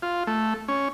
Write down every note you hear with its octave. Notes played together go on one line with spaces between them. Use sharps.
F4
A3
C#4